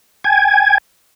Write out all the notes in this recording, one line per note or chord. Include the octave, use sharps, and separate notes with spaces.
G5 G#5 G#6